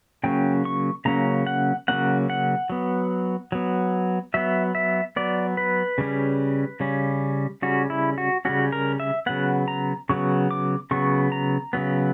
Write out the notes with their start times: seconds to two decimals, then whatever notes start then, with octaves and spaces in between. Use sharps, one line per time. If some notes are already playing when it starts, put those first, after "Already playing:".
0.23 C#3 F#3 A#3 C#4 G5
0.65 C#6
1.05 C#3 F#3 A#3 C#4 A#5
1.47 F#5
1.88 C#3 F#3 A#3 C#4 F#5
2.30 F#5
2.70 F#3 B3
3.52 F#3 B3
4.34 F#3 B3 E5
4.75 E5
5.16 F#3 B3 D5
5.57 B4
5.98 C#3 G3 C#4
6.80 C#3 G3 C#4
7.62 C#3 G3 C#4 F#4
7.90 E4
8.18 F#4
8.45 C#3 G3 C#4 F#4
8.72 A#4
9.00 E5
9.26 C#3 F#3 B3 F#5
9.68 A#5
10.09 C#3 F#3 B3 C#6
10.51 D6
10.91 C#3 F#3 B3 C#6
11.32 A#5
11.73 C#3 F#3 B3